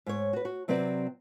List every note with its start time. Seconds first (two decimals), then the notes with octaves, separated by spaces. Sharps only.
0.06 G#2 C#5
0.33 F#4 B4
0.45 F#4
0.68 C3 F#3 C4 B4 D5